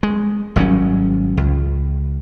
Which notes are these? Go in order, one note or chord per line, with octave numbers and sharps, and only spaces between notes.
G#3
G#1 F#3 G3 C#4
C#2